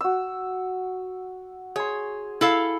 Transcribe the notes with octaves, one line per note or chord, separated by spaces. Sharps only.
F#4 E6
G#4 C#5 C6
E4 A4 F5